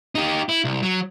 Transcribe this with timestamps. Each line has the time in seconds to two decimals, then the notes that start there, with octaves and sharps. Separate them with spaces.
0.15 D#4 G4
0.49 E4
0.64 C2
0.82 F#3